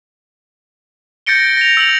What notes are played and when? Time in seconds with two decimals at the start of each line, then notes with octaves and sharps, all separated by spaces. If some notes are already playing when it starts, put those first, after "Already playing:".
1.26 G6 A6 A#6 C#7 D7 G7
1.57 A#6 F7
1.77 E6 A#6 F7 F#7